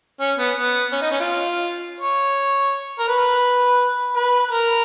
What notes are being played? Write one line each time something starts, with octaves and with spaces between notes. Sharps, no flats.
C#4
B3
B3
C#4
D#4
C#4
F4
C#5
A#4
B4
B4
A#4